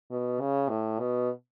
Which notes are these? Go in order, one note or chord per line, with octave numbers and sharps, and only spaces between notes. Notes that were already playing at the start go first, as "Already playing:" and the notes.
B2
C#3
A2
B2